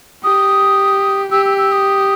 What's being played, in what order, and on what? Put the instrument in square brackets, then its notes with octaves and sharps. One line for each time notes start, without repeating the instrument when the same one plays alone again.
[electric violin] G4 [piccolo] D#6
[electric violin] G4 [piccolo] E6
[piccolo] E6
E6
D#6